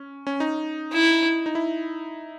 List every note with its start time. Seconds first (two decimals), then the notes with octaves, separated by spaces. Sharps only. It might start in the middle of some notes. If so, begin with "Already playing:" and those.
Already playing: C#4
0.27 C#4
0.40 D#4
0.93 E4
1.46 D#4
1.55 E4